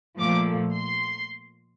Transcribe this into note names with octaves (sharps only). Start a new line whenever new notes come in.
A#2 F3 A3 D6
C6